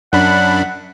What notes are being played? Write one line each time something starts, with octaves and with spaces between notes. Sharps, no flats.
F#2 D4 F#5 B5